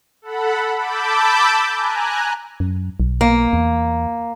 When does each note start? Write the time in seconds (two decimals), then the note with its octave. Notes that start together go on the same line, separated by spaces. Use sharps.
0.22 A4 F#5 B5
0.75 A5 B5 D6 E6 G6
1.74 G#5 A#5 F#6
2.60 F#2
3.00 B1
3.21 A#3
3.53 E2